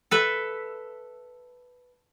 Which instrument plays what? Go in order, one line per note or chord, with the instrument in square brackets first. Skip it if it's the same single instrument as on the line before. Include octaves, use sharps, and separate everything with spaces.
[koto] A4 B4 E5